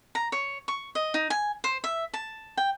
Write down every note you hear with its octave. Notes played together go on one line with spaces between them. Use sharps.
A#5
C#5
C#6
D#5
D#4
G#5
C5
E5
A5
G5